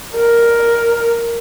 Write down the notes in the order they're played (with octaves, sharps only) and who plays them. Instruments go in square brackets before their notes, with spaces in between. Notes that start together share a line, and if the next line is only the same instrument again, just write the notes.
[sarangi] A#4